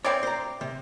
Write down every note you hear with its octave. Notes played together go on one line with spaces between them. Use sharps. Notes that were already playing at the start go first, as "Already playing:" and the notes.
C4 E4 C#5 D5 D6
C5 A#5
C3